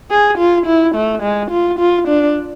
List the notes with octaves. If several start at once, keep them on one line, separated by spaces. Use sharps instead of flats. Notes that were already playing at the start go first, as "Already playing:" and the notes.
G#4
F4
E4
A3
G#3
F4
F4
D4